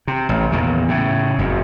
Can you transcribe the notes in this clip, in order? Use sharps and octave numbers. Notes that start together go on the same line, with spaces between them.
C3
A1
E2 A#2 D#3
A2 C#3
F#1 F2